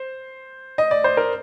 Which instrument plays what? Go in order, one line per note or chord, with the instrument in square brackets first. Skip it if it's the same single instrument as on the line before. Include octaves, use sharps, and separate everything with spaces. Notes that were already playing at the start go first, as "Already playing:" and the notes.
Already playing: [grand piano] C5
D#5
D5
C5
A#4